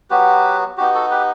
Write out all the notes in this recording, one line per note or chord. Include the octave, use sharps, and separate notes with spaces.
F#3 B3 F#4 G4 B4
B3 D#4 F#4 G4
F#4 A4
G4 B4